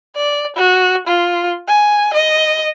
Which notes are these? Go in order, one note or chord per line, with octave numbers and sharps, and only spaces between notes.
D5
F#4
F4
G#5
D#5